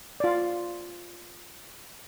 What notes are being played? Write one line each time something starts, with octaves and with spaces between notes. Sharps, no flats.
F4 D5